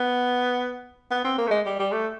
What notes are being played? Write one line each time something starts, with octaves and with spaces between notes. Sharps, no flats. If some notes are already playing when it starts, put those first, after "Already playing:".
Already playing: B3
B3
C4
A#3
A3
G#3
G3
G3
A3